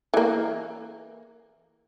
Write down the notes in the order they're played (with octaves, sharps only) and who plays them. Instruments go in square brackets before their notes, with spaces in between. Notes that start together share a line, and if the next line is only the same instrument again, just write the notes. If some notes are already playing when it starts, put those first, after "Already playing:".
[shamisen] E3 A#3